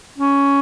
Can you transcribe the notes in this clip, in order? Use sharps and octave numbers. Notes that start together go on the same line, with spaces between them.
C#4